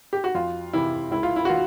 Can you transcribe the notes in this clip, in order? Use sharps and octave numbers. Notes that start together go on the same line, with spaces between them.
G4
F#4
F2 F4
C3 E3 E4
C#2 E4
F4
E4
F#4
E3 F4